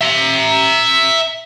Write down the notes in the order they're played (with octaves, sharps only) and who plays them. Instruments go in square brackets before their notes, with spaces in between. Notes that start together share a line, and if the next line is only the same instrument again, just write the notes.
[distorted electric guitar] E5 A#5